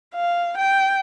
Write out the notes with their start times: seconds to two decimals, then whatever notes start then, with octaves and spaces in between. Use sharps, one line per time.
0.15 F5
0.58 G5